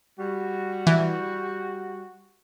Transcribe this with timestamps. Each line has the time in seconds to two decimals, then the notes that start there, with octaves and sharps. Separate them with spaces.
0.19 G3 F#4
0.87 E3